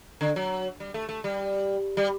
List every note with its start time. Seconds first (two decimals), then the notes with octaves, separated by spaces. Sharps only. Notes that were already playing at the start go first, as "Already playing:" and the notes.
0.21 D3
0.36 F#3
0.80 G3
0.94 A3
1.09 A3
1.24 G3
1.97 G3